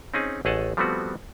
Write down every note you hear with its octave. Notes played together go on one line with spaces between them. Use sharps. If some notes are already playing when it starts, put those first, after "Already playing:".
C4 C#4 D#4 G#4
A1 A3 G#4 D#5 F#5 A5
F3 G3 A3 B3 C4 F#4